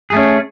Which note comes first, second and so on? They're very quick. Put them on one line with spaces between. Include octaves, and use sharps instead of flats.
G#4 A3 C#4